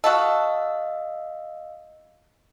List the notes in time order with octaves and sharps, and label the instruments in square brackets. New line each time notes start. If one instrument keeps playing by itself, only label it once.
[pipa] F#4 A4 [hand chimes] D#5 F5 E6